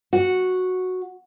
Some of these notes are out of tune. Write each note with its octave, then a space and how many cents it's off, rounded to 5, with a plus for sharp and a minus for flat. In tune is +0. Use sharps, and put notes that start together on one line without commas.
F#4 -5